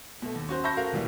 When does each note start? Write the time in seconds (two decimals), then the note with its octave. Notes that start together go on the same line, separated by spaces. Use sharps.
0.22 B2 A3
0.35 D#2
0.49 C#4 F#4 C5
0.64 E5 A5 B5 C#6 G6 A#6
0.77 A3 F#4 A#4 F5
0.93 E1 A#2 E3 G3